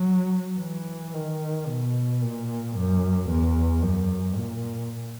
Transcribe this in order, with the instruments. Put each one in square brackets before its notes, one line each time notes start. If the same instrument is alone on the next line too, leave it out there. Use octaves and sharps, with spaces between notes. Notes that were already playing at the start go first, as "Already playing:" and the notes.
Already playing: [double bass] F#3
E3
D#3
B2
A#2
F#2
E2
F#2
A#2